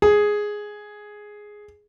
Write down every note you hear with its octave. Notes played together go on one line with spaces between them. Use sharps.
G#4